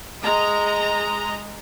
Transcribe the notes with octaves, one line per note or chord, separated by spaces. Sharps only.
G#3 D#5 A#5